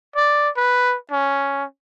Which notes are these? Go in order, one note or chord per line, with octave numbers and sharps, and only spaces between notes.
D5
B4
C#4